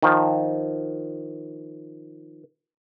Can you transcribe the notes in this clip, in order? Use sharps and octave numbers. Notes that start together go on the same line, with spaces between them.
D#3 F3